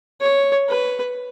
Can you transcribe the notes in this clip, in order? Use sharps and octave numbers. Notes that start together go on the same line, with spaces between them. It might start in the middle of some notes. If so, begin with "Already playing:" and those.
C#5
B4